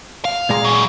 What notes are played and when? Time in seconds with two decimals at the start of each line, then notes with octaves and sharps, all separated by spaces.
0.25 F5
0.49 A#2 G#3 A#5
0.64 E3 F#3